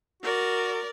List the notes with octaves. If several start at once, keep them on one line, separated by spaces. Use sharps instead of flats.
F#4 A#4 D5